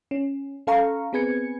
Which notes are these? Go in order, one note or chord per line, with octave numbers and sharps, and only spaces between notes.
C#4
C#4 A4 F5 A#5 C#6
B3 C4 G#4 B4 G#6 C#7